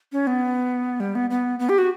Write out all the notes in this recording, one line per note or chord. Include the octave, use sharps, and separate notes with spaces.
C#4
B3
G3
B3
B3
B3
G4
F#4